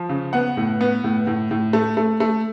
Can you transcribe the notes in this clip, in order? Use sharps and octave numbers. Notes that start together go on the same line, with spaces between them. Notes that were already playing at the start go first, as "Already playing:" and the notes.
Already playing: F3
C#3
B3 F#5
A2
B3
A2
A2
A2
A3
A3
A3